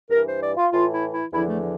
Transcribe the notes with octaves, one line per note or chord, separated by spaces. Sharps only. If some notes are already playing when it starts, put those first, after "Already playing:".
G2 E3 A#4
C5
D5
F4
A2 E3 F4
E4
E4
E2 D3 F3 E4
A3